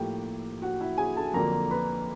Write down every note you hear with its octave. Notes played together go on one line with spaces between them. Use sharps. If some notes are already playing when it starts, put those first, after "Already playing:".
Already playing: A2 F3 A#3 G4 G5
F#4 F#5
E4 E5
G#4 G#5
A4 A5
F2 D3 F#3 A#3 A#4 A#5
B4 B5